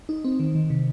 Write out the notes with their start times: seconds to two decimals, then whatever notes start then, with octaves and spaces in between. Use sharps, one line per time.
0.09 D#4
0.25 C4
0.40 D#3
0.55 D#3
0.70 C3